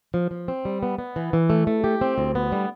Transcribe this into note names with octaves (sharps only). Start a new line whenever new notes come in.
F3
F3
C4
G3
B3
B3
E3
E3
A3
A3
G4
C4
D2
B3
G3